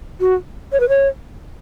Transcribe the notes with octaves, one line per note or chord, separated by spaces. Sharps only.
F#4
C#5
B4
C#5